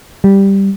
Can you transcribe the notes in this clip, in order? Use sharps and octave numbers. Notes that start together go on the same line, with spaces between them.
G3